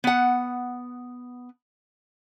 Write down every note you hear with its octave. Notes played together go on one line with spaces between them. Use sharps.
B3 F#5